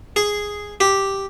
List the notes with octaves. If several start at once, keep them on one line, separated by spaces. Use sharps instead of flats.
G#4
G4